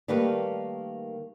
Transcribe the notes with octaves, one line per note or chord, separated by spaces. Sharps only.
D#3 G3 A3 A#3 G4 B4